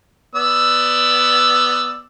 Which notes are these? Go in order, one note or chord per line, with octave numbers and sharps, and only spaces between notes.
B3 D5 E6